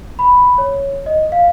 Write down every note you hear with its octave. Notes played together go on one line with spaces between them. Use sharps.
B5
C#5
D#5
F5